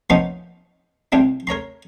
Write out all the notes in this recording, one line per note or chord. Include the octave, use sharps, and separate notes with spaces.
F3 A#3 B3 C#4 D#4 F4
C2 C3 C4 D4
A#4 C#5 A#5 C6